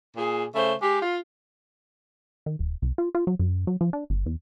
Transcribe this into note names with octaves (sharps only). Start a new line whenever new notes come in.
A#2 G#4
C#3 A3 C5
G#3 G4
F4
D#3
D#1
C2
F4
F4
F#3
F#2
F#3
F3
D4
G1
E2